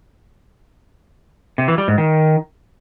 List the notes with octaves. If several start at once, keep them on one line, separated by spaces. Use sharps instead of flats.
C3
E3
G3
G#2
D#3